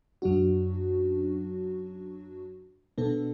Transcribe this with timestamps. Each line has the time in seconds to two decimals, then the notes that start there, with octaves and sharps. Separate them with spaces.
0.22 F#2 F#3 D4 F#4
2.98 B2 B3 D4 A4